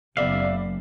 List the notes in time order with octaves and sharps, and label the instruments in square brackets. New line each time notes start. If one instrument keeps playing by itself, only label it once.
[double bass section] F#1 [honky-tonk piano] B3 D5 F#7 [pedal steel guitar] E5 F5